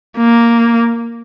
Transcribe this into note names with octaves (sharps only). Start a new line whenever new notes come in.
A#3